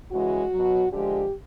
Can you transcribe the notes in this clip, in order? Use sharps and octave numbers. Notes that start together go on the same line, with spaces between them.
C#3 E3 G#3 F#4
B2 F#3
D3 F3 G#3 G4